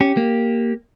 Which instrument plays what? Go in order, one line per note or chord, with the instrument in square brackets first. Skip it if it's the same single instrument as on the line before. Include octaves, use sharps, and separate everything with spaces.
[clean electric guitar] C#4 [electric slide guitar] G4
[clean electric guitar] A#3